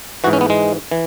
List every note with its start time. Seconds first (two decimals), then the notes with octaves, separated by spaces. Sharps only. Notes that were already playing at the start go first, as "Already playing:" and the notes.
0.24 G#2 E3 F#4
0.33 C#4
0.41 B3
0.50 G#3
0.91 E3